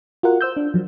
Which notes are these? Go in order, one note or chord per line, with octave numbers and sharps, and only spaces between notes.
F4 F#4 A#4 F#5
C5 E6 G6
D4
F3 F#3